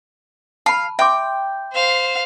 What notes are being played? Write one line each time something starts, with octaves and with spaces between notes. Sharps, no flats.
F5 A5 B5
E5 G5 C6 D6
C5 F5